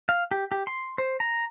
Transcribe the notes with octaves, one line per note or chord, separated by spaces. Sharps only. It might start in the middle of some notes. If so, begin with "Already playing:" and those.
F5
G4
G4
C6
C5
A#5